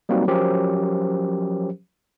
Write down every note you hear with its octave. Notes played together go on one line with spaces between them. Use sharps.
F#3 G3 A#3 C4 D#4 F#4
F3 F#3 C#4 G4 A#4 C5